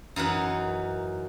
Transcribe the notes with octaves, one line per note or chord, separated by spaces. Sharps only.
F#2 E3 D#4 F#5